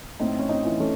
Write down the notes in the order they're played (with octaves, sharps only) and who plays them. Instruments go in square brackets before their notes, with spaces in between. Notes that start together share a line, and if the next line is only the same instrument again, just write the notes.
[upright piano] A2 [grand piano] C4 D#4
[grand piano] C#4
C4 D#4
[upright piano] E3
[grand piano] A3 C#4